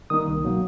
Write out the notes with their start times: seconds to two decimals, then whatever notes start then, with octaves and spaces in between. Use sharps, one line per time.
0.10 D#3 G3 A#3 D#4 D#6
0.28 C2
0.44 B2 F#3 A#3